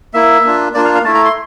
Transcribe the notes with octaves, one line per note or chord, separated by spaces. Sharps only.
A#3 E4 E5
A#3 D4 F4
A#3 D4 F4 D5
F5
F5
A3 E4 A5
A#5
C6